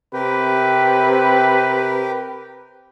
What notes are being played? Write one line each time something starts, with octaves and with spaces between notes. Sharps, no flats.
C3 G4 A#4 B4 G5